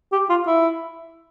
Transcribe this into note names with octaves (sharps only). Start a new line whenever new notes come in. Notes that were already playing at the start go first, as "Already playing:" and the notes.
G4
F4
E4